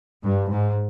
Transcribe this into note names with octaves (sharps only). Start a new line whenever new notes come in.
G2
G#2